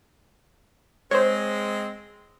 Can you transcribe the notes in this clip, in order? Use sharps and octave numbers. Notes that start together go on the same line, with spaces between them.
G#3 C4 C5 C#5